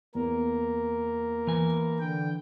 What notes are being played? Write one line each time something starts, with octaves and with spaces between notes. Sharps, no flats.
E2 A#3 A#4
E3 G#5
D3 G5